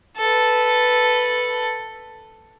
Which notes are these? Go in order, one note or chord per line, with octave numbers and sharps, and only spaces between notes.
A4 B4